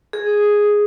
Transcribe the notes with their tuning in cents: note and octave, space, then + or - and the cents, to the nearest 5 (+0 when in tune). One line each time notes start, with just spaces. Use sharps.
G#4 +0